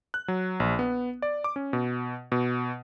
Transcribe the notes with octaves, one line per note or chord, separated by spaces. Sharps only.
F#6
F#3
A#1
B3
D5
D6
C#4
B2
B2